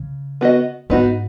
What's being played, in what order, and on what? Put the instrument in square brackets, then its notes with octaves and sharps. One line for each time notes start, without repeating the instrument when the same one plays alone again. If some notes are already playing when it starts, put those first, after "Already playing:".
Already playing: [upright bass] C#3
[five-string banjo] B3 F#4 D#5
[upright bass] G#2 [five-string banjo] B3 D#4 F#4